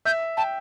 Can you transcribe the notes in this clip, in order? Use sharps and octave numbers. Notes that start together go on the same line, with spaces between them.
E5 G6
G5 A5